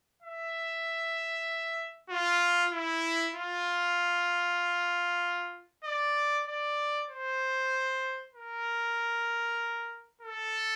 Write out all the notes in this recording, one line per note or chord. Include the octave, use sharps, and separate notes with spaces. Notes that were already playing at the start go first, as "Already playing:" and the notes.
E5
F4
E4
F4
D5
D5
C5
A#4
A4